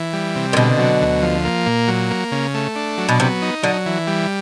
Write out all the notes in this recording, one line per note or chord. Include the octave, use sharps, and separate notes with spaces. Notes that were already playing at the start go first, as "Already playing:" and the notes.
Already playing: E3
G3
C3
A#2
B2 D3
F#3
D2
F3
A#3
A#2
F#3
A#3
C#3
A3
D4
F#3
B2
C3 B3
D#4
D3 F#3
E3
G3